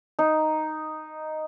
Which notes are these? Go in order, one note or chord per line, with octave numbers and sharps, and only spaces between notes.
D#4